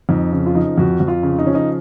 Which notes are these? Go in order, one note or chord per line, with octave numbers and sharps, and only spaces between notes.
F2 D#4
C#3
F4
F3 D#4
F2 F#4
F2
F4
C#3
D#4
F3 C#4
D#4